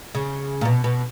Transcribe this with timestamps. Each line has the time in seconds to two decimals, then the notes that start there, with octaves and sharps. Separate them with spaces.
0.15 C#3
0.61 A#2
0.65 B2
0.84 B2